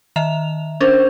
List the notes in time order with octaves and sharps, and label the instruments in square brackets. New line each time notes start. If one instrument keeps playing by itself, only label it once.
[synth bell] D#3 E5 F7
[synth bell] C#4 D4 A#4 [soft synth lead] C5